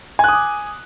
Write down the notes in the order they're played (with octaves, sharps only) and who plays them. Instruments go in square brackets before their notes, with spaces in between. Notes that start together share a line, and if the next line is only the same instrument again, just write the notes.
[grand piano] G#5
F#6
D#6
D6